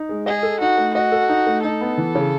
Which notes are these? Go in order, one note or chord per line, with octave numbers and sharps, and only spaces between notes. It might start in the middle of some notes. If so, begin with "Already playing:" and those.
Already playing: D#4
G#3
G#4 D#5
A4
D#4 F#4
A3
F#4 D#5
A4
D#4
A3
D#4 A4
B3
E3
C#3